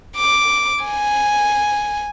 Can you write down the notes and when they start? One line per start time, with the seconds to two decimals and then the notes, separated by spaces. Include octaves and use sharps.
0.17 D6
0.85 G#5